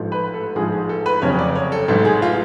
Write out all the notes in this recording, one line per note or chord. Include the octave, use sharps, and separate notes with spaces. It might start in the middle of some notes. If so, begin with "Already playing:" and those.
Already playing: A1 G#2 F3 A3
B4
A4
A1 G#2 F3 G#4
G#4
A4
B4
F1 F2 C#3 F#3 C#5
D5
C#5
A4
A1 G#2 F#3 A3 A4
G#4
F4